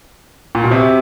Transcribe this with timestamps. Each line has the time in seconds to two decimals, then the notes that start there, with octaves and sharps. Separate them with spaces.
0.55 A#2
0.64 B2
0.71 C3